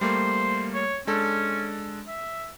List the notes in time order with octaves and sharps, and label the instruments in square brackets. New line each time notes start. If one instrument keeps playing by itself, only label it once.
[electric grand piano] G3 A3 A#3 [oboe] C5
[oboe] C#5
[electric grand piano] G#3 D4 A4 [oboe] C#4
[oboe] E5